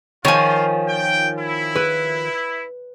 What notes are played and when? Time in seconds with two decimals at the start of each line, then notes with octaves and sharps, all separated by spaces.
0.25 D#3 F3 F4 C#5 G#5
0.88 G5
1.39 E4
1.75 B4